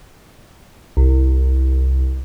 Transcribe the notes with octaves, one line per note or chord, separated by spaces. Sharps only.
C2